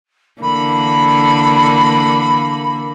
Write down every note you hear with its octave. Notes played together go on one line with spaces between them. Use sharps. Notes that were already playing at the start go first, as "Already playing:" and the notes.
D3 E3 A#3 B5